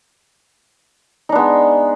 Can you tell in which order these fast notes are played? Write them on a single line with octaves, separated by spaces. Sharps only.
D#4 D4 B3 G#3